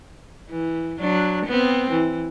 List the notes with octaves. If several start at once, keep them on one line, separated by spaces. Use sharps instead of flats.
E3
F#3 D4
B3 C4
E3